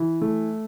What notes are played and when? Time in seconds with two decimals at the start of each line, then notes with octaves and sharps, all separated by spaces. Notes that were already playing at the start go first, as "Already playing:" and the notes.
Already playing: E3
0.22 A3